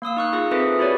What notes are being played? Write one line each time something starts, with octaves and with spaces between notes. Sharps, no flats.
A#3 F5 D#6 E6
D#4 C#6 F#6
D#4 F4 G#4 D#6
C4 F4 G#4 A4 B4 E5
E4 F#4 G4 B4 C#5 D5